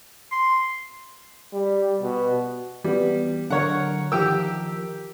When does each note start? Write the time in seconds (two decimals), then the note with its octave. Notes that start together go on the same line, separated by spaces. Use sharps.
0.32 C6
1.53 G3
2.02 B2
2.84 E3 G3 B3
3.50 D3 F#3 A#4 C#5 F#5
4.12 D#3 F3 G4 A#4 G5 E6